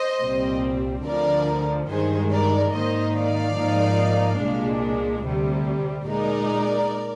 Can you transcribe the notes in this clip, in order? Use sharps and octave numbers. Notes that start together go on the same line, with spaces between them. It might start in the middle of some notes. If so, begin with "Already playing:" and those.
Already playing: C5 D#5
C2 A#2 G3 C4
D2 D3 F3 A#4 D5
G2 D#3 G#3 G#4 C5
A#4 D5
G#2 D#3 A#3 D#4 C5 D#5
D5 F5
G#2 F3 A#3 D#4
C2 A#2 G#3 D4
D2 C3 G3
A#2 G#3 D#4 A#4 D5